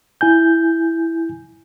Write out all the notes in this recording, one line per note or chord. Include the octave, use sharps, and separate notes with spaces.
E4 G#5 G6